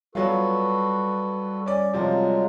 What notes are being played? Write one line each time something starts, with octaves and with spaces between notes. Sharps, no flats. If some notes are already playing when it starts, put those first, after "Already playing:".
F#3 G3 B3 F4 F#4 A4 B4
C#4 D5
C3 F3 F#3 G#3 F4